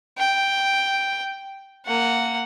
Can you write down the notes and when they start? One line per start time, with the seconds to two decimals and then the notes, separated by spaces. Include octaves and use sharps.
0.18 G5
1.86 A#3 F#5